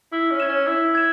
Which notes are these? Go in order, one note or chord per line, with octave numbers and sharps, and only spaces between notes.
E4 E6
C#4
G#6 E7
C#4
E4 E6
G#6 E7